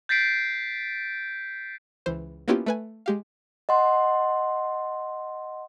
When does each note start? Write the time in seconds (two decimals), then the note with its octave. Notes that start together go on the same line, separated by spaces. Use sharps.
0.09 G6 A6 B6 C7 D7
2.06 C#2 E3 C5
2.48 A#3 B3 C#4 E4 F4 G4
2.66 A3 B4 G#5
3.06 G#3 G4 F5
3.69 D#5 F#5 C6